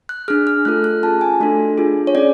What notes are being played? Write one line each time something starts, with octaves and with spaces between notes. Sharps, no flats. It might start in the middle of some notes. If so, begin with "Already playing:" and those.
F#6
D4 G#4 F6
F6
A3 F4 A4 F#6
F#6
C#4 F4 G#4 A5
G#5
A3 D4 F#4 A4
D4 F4 G#4
C#5
C#4 G#4 D5